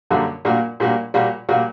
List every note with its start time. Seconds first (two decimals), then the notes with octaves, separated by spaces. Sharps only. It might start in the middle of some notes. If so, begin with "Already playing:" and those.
0.10 F#2 D3 G3 A#3 F#4
0.45 A#2 G3 A#3 F#4
0.80 A#2 G3 A#3 F#4
1.14 A#2 G3 A#3 F#4
1.49 A#2 G3 A#3 F#4